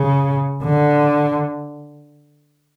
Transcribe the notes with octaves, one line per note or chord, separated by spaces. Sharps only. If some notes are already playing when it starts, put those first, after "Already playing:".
Already playing: C#3
D3